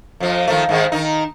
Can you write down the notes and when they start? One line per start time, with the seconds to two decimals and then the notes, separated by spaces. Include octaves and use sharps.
0.20 F2 F3
0.48 D#3 F3 A3
0.69 G#2 D#3 G#3
0.92 D#3 D#4